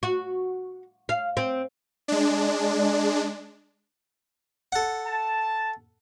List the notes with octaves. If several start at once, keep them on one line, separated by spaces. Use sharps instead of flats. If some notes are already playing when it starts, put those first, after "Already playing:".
F#4
F5
C4
G#3 D4
A4 F#5
A5